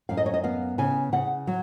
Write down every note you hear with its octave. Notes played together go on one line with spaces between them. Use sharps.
F#2 F5
D#5
C#5
D#5
B3 F5
C#3 G#5
C#3 F#5
F#3